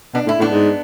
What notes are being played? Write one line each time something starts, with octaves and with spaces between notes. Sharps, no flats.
B2 D4
A2 E4
A2 B3 D4
G#2